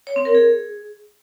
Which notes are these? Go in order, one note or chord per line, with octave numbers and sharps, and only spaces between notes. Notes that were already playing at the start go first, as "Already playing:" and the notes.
C#5
C4
A#4
G#4